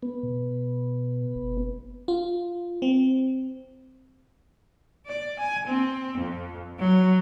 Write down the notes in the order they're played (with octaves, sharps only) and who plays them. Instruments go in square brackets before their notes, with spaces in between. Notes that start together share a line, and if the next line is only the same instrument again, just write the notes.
[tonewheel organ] B3
[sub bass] B2
F#1
[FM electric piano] F4
C4
[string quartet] D5
G#5
C4
F2
F#3